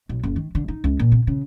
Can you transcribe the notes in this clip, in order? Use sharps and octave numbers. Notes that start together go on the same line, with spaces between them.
B1
F#1
D#3
D3
D#4
C#2
A#2
C3
C#3